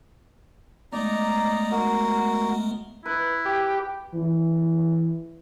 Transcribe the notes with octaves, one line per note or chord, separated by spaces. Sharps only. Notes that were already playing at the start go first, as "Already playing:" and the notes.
G#3 A3 B3 D#4 D5 A#5
F#4 A#4
E4 B4
G4
E3